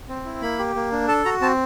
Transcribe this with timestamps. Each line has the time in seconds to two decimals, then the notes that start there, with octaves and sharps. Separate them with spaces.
0.09 C4
0.25 E4
0.42 A#3 B5
0.59 G4
0.75 A#3
0.92 D4
1.08 A4 A5
1.25 F#4 A#5
1.42 C4 A5